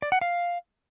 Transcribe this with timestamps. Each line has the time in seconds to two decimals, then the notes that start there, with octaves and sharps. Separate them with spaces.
0.02 D5
0.12 F#5
0.21 F5